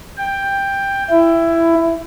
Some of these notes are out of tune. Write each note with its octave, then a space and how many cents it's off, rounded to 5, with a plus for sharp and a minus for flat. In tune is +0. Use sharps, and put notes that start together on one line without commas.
G5 +10
E4 +15